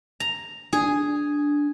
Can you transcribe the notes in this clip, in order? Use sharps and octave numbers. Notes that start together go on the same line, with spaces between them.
A#5
D4 G#4